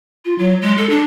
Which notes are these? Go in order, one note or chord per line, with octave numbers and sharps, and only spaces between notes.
F4
F#3
G#3
A4
D4